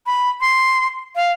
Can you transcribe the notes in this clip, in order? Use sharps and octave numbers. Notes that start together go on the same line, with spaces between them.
B5
C6
F5